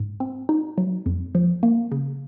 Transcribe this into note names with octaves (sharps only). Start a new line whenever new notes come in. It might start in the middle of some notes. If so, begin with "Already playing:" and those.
Already playing: G#2
C4
D#4
F#3
F2
F3
A#3
C#3